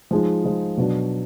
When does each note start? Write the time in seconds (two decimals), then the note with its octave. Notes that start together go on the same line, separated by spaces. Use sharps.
0.11 F3 G#3 D#4
0.44 F3 G#3 D#4
0.77 B2 F#3 D4 F#4